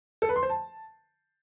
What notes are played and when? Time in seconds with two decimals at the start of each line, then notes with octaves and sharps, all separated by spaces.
0.22 A4
0.29 B4
0.36 C6
0.43 C5
0.50 A5